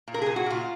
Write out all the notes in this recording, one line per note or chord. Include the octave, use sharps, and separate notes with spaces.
A#2
A#4
A#2 G#4
F#4
A#2 F4